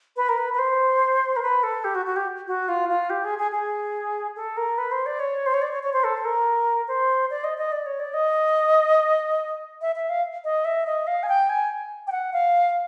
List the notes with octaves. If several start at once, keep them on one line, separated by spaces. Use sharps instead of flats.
B4
A#4
B4
B4
C5
A#4
B4
A4
G4
F#4
F#4
G4
F#4
F4
F4
G4
G#4
G#4
G#4
A4
A#4
B4
C5
D5
C#5
C5
C#5
D5
C#5
C#5
C5
A4
A#4
C5
D5
D#5
D#5
D5
C#5
D5
D#5
E5
E5
F5
D#5
E5
D#5
F5
G#5
G5
G#5
G5
F#5
F5